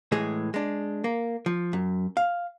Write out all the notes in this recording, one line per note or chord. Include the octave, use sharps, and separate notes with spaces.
A2 E3 G#3 G#4
G#3 D4
A#3
F3
F#2
F5